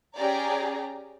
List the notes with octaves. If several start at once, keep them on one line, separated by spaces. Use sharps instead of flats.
C#4 G4 G#4 D5 A#5